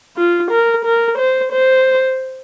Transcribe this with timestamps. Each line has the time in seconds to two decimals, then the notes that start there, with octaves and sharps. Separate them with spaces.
0.17 F4
0.51 A#4
0.85 A#4
1.18 C5
1.52 C5